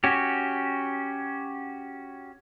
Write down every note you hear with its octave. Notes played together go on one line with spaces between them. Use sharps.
C#4 F#4 G4